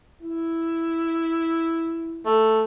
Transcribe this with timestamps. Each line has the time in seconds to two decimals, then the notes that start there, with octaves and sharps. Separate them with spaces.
0.22 E4
2.26 A3